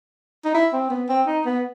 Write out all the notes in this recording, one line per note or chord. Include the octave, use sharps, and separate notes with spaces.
D#4
E4
C4
B3
C4
D#4
B3